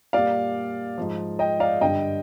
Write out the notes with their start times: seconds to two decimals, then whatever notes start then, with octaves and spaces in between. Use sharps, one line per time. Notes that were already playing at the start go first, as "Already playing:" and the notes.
0.13 A#2 G3 D5 F5
0.98 G#2 F3
1.39 D#5 G5
1.60 D5 F5
1.81 G2 D3 G3 D#5 G5